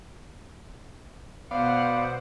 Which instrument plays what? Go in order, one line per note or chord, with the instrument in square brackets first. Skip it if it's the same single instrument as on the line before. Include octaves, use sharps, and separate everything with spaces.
[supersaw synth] B2 C5 [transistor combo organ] B3 D5 [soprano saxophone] F5 [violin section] F#5 C#7